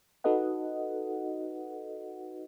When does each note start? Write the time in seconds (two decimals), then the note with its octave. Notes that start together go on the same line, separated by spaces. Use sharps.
0.24 D#4 F#4 A4 B4 D#5 F#5